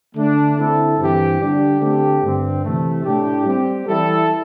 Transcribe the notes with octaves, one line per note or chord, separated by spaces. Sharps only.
D3 A3 D4
D3 C4 E4 A4
G2 E3 C4 G4
D3 G3 D4 G4
D3 A3 C4 G4
G2 D3 C4
C3 E3 A3
A2 A3 D4 G4
G3 C4 G4
E3 G3 E4 A4